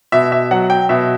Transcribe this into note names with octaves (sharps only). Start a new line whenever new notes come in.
B2 E5
E5
F#3 F#5
G5
B2 E5